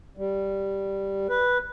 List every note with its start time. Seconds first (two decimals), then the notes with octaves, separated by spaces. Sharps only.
0.17 G3
1.29 B4